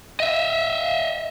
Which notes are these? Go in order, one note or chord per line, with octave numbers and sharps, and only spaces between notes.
D#5 E5